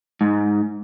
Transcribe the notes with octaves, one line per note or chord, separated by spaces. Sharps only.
G#2